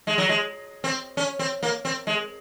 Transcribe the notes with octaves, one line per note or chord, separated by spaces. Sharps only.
G#3
F#3
G#3
C4
C#4
C4
A#3
C4
G#3